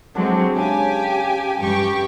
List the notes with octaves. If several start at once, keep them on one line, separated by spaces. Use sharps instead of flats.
D3 F#3 G#3 C4 D4 D6
C#3 G4 G#5
G2 G4 C#6